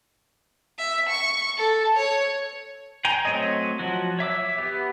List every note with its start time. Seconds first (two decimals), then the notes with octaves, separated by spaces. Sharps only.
0.78 E5
1.09 C#6
1.57 A4
1.97 C#5
3.05 G5 G#5 A#5
3.25 F#3 A3 C4 C#5 D#5
3.79 F3 F#3 F#4
4.19 C#5 E5 D6 E6
4.58 B3 G4